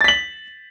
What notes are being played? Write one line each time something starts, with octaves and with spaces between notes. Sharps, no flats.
A6 B6 F#7